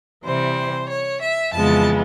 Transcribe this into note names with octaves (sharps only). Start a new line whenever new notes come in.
C3 E3 G3 C5
C#5
E5
F2 C#3 E3 G#3 B3 A5